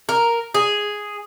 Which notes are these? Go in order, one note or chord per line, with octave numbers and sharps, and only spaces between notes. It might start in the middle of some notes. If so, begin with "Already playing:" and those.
A#4
G#4